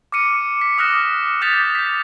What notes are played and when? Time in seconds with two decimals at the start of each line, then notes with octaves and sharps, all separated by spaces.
0.12 D6 F6 C#7 D#7
0.61 B6
0.78 D6 D#6 F6 F#6 A#6 E7
1.41 D6 D#6 G6 A6 B6 F7
1.75 G6 B6